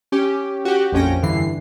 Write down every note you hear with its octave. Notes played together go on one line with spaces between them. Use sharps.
C#4 G4
F#4 G4
A#1 F2 C#4 G5 A#6
G2 D3 E3 C7